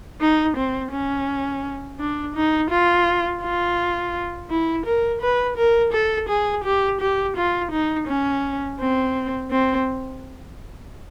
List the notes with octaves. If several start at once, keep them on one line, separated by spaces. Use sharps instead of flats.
D#4
C4
C#4
D4
D#4
F4
F4
E4
A#4
B4
A#4
A4
G#4
G4
G4
F4
D#4
C#4
C4
C4